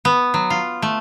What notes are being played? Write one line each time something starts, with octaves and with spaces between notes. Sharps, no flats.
B3
F#3
F4
A3